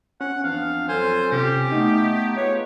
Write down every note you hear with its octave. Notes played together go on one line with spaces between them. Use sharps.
C#4 F#5
F2 E3 B3 D4 F5
F#3 F4 A4 C5 G#5
C3 C#4 G4
A3 B3 D#4
F4 G#4 B4 C#5